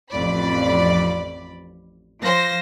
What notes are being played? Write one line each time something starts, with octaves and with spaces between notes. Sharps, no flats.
A1 F2 D5 B5
F3 C5 A#6